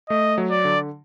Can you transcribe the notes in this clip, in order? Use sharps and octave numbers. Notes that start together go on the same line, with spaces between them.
A3 D#5
F#3
D5
D3